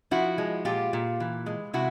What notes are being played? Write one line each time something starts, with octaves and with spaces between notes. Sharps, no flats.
F3 E4 F#4
G#3
A#2 F4 G4
A#2
E3
G#3
C3 E4 F#4